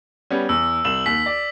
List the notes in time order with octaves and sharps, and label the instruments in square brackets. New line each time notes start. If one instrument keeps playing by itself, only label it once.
[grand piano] G3 B3 C#4
[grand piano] E2 [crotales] E6
[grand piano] C2 E7 [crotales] F#7
[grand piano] D#2 [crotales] B6
[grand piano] D5